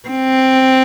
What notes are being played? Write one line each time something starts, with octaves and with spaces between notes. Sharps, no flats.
C4